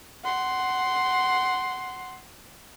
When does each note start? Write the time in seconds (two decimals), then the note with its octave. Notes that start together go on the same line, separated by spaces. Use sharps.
0.25 F#5 C6